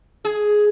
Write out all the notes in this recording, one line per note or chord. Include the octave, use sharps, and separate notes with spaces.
G#4